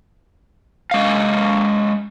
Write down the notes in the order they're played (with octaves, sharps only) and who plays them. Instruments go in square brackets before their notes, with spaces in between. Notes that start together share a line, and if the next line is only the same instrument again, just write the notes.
[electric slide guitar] G#3 A#3 F5